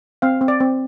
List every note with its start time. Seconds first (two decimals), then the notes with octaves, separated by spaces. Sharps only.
0.22 C4 F5
0.41 C4
0.48 D5
0.60 C4